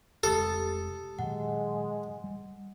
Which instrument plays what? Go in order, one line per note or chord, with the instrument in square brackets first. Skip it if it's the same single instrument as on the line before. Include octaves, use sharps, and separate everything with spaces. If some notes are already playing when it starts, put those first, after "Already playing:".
[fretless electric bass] F1 C3 G#3 [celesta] G4 D#6 A6 [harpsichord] A4
[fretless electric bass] A#2 D#3 F#3 [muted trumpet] G#3 [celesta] F#5
[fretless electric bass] G3